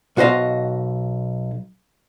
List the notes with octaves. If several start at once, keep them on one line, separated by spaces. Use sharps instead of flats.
B1 F#4 C5 D#5 F5